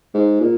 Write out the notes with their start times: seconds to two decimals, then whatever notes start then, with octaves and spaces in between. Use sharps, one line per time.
0.14 G#2
0.41 A#2